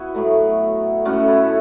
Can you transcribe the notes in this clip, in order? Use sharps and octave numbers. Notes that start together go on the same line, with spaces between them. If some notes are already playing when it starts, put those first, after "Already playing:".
Already playing: B3 E4 F#4
A2 F#3 A3
A2 A3 C#4 F#4
E4 A4